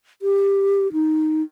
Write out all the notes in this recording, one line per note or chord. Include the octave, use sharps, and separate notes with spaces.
G4
D#4